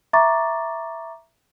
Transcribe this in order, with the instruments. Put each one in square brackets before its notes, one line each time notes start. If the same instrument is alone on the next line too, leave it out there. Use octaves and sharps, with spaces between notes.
[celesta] E5 A#5 C#6 D6 A6